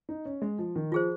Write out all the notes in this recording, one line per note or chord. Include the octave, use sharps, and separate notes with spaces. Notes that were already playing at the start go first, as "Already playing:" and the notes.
D#4
C#4
G#3
F3
D#3
F3 F4 G#4 C5